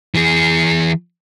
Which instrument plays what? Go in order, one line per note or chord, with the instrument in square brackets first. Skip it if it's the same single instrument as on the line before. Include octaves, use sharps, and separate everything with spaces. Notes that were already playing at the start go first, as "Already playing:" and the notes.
[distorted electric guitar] E3 G#4